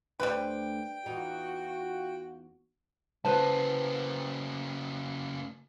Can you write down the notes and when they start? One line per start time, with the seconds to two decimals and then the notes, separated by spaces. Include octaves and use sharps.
0.20 D2 G3 F4 B4 C5 G5
1.06 E2 B3 D#4 F4 F#4
3.25 C#3 A#3 B4 C5 A5